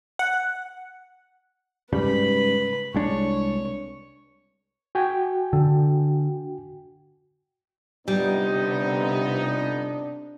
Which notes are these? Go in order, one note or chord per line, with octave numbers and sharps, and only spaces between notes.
F#5
G#2 C#3 G3 B4 B5
C2 G#3 D4 C#5
F#4 G5 G#5
D3
G1 C3 G3 B3 D4 D#4